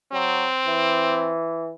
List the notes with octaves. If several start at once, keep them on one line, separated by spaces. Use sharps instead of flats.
F#3 C4
E3